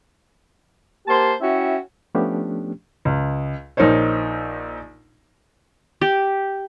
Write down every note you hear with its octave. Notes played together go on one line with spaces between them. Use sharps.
A#3 G4 C5 A5 C6
C#4 E4 F#4 E5 G5
F3 A3 B3 C#4 D4 G4
C#2
A#1 D#4 A#4 C5 C#5
G4